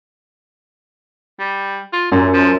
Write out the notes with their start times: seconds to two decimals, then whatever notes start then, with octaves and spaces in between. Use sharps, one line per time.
1.40 G3
1.93 F4
2.12 F#2 A#2
2.33 F3